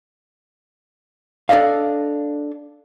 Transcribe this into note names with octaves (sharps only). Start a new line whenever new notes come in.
D4 A4 D5 D#5 F5